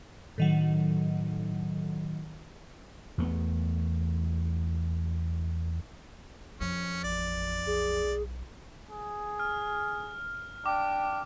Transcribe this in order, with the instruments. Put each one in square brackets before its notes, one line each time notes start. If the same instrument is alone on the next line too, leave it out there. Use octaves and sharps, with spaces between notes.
[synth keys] A2 D#3 F#3
[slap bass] E2 A3 B3
[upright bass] F2 [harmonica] C#4
[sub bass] A1 [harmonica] D5
[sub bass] B1 [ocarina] G#4
[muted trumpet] G#4
[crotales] F6
[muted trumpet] D4 [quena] G5 [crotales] D6